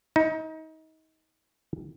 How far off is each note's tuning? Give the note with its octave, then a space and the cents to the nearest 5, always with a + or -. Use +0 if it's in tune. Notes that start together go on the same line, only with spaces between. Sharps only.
D#4 +30